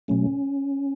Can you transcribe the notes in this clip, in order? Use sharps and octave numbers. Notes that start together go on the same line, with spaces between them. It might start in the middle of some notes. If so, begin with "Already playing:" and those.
B2 F#3 A3 C#4